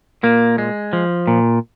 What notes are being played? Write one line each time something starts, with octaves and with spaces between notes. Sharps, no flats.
A#2 A#3
G#3
F3
A#2